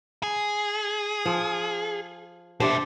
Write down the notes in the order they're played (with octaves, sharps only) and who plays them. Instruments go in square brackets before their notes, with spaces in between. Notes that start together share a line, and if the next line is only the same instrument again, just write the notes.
[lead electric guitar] G#4
[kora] F3
[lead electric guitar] B2 E5 [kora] D4 G4 C5